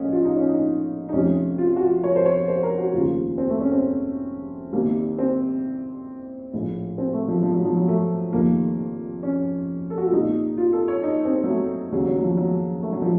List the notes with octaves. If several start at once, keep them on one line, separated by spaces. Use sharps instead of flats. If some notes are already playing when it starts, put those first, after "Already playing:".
Already playing: A#1 A2 C#4 A4 C#5 D#5
F4
D#4
C#4
D#4
D#4
F1 F2 C3 C#4
F4
F#4
F4
C#5
C5
C#5
C5
A#4
F#4
F1 D#2 C#3 F4
C4
A3
C#4
C4
C2 C3 D#3 A#3
C4
A#1 A2
C4
A3
F3
F3
F#3
F3
F#3
A3
F1 F2 D#3 A#3
C#4
A4
F#4
F4
C2 A#2 D#4
F4
A4
C#5
D#4
C4
F#3
A3
D#2 C#3 F#3
F#3
F3
F#3
A3
F#3
F3